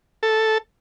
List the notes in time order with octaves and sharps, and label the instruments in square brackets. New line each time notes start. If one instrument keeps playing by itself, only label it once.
[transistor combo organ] A4